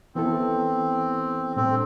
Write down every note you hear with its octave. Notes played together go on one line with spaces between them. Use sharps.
E3 B3 C4 E4 A4
A2 G3 C4 D4 A4